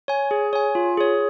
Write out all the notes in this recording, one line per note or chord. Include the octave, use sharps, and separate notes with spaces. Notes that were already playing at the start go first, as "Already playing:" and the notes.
C#5 G#5
G#4
C#5 G#5
F4
G#4 C#5